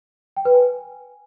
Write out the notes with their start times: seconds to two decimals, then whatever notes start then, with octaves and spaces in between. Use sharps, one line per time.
0.37 G5
0.45 B4
0.54 G#5